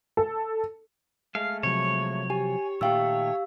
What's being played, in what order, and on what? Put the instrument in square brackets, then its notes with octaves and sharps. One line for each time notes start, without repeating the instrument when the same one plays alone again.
[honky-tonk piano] A4
[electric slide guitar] G#3 A3 [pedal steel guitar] F5
[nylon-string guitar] C3 F3 F#3 [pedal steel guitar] C#5
[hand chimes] G4 [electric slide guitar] G#5
[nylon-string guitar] A#2 [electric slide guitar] D#3 A3 G5 [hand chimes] G4 F5 E6